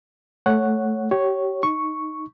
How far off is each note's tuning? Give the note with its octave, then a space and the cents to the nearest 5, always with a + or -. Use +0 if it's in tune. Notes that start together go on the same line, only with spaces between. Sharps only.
A3 -5 C#5 +0 F#5 +0
G4 -30 C#5 +0
D#4 +0 C#6 +0